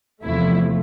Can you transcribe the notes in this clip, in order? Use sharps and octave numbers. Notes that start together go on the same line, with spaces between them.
E2 C3 F3 A3 E4